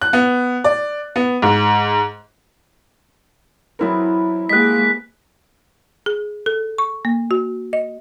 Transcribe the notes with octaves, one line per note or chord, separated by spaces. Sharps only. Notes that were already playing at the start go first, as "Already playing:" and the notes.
F#6
B3
D5
B3
G#2
E3 F#3 B3 C4 E4 A#4
G#3 A#3 G4 G#4 D#5 F#5 F#6 B6
G#4
A4
C#6
A#3
F#4
D#5